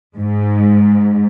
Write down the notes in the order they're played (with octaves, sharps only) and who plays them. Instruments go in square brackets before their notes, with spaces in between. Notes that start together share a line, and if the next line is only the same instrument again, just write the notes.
[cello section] G#2